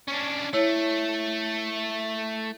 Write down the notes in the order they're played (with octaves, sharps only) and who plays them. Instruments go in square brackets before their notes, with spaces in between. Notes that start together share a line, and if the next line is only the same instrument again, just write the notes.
[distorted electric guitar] C#4 D4
[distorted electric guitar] A3 [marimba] E4 C#5